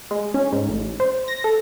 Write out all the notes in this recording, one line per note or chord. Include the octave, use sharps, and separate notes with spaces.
G#3
C#4
G#2
A1
C5
A#6
A4